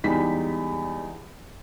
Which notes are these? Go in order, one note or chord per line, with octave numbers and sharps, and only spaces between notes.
E2 G3 G#3 D#4 B6